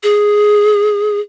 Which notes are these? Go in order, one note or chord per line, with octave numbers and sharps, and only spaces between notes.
G#4